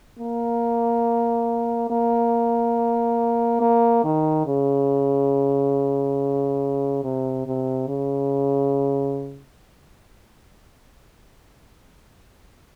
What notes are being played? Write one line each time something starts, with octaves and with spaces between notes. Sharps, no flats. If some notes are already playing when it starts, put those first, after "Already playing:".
A#3
A#3
A#3
D#3
C#3
C3
C3
C#3